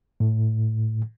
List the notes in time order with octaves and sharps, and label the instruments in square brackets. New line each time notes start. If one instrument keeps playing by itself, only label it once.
[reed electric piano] A2